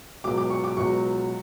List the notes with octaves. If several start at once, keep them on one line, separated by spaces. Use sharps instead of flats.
C#2 B2 F#3 D6
D6
C#6
D6
C#2 B2 F#3 C#6